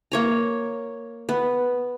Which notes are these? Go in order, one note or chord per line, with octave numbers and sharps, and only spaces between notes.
A#3 C#5 A#5
B3